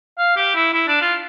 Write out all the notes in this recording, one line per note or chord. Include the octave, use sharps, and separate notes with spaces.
F5
G4
E4
E4
D4
F4